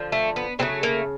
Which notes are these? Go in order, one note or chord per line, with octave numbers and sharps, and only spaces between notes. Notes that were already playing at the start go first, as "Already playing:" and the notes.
Already playing: D3 F3
A3
B3
C#3 F#3 A3 C4
A#3